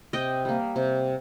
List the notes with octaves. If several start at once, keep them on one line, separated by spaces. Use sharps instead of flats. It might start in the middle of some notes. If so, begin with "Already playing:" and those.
C3 D#5 G5
G3 A#3
C3